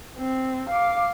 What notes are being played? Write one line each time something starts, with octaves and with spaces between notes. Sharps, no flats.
C4
F5 D6